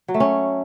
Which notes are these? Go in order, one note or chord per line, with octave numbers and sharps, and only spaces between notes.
F#3
A3
C#4